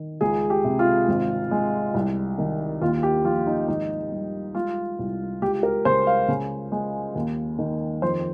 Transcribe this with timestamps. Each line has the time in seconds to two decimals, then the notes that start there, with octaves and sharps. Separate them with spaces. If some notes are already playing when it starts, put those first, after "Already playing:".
Already playing: D#3
0.21 C#2 G#4
0.50 G4
0.64 C3
0.79 F4
1.08 G#1
1.51 G#3
1.94 C2
2.38 D#3
2.82 D#2 F4
3.03 G4
3.25 F3 F4
3.47 D#4
3.68 G#1 D#4
4.11 G3
4.55 G#3 F4
4.99 C2
5.42 C#2 G4
5.63 A#4
5.85 C#3 C5
6.07 F5
6.28 C#3
6.72 G#3
7.15 D#2
7.59 D#3
8.02 F2 C5